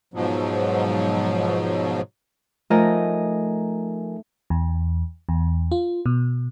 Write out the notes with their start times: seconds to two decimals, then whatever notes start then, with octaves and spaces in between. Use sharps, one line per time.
0.14 G#2 B2 F3 F#3
2.70 F3 A3 D#4 A#4 D#5 G#5
4.50 E2
5.29 E2
5.72 F4
6.06 B2